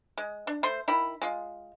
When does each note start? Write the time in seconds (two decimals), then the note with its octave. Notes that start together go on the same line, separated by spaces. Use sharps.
0.18 G#3
0.47 D4
0.63 A3 C5 C6
0.88 D#3 E4 B5
1.22 G#3 F4